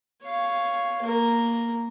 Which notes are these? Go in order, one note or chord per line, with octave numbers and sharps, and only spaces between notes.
C#5 F5
A#3 A#4